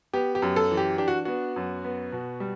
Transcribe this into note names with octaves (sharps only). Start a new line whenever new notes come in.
B3 G4
G4
F#2
A4
E3
G4
D4 G4
F#4
B3 F#4
F#2
B3
B2
G3